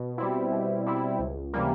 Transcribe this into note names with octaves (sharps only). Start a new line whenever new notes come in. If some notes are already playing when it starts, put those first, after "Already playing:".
Already playing: B2
G3 C4 E4
B2
G3 C4 E4
C#2
C3 E3 G3 A#3